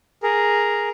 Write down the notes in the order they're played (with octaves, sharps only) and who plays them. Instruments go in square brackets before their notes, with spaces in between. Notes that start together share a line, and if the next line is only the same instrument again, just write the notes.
[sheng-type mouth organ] G#4 A#4